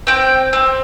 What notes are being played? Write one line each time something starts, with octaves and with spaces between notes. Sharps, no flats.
C4 G5
C4